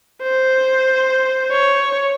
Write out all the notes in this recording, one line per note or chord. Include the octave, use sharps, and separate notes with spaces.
C5
C#5